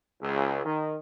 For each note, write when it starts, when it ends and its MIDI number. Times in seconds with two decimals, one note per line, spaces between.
0.22 0.65 37
0.65 0.98 51